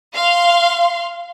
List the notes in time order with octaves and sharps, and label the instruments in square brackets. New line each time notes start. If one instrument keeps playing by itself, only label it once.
[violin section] F5 C6